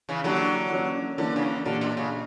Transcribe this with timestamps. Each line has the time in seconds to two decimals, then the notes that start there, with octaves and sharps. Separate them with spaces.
0.09 C#3 E3
0.24 D3 F#3 A#3 E4 G4
0.71 E3 A#3 C#4
1.18 D3 E3 A#3 C#4
1.36 C#3
1.42 D3
1.66 A#2 D3 A#3 D4 G4 A#4
1.81 B2
1.97 C#3